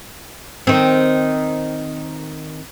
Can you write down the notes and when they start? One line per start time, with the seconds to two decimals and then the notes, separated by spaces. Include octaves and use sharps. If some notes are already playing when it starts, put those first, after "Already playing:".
0.67 D#3 C4